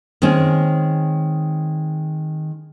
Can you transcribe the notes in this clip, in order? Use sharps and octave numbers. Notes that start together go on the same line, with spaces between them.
D#3 G#3 C4 C#4